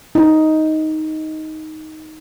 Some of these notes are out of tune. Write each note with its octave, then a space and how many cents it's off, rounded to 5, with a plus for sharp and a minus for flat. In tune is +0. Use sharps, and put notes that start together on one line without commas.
D#4 +5